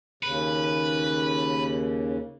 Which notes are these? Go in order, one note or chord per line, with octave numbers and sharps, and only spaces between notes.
D#2 C#3 B4